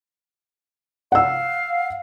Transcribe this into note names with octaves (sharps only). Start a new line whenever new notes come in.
F5 F#5 E6